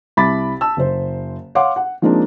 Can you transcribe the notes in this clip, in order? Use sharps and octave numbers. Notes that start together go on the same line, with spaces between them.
C2 B5 D6 A6 B6
A5 E6
F#1 C5
C#5 F5 F#5 C6 D6
F#5
F3 G#3 A#3 C4 D4 D#4